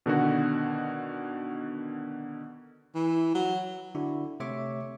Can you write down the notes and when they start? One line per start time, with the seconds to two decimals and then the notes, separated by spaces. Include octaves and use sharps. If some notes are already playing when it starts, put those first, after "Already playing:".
0.06 B2 D3 D#3 F#4
2.95 E3
3.34 F#3
3.95 D3 D4 E4 F#4
4.40 C3 A3 C#5 E5 C#6 D6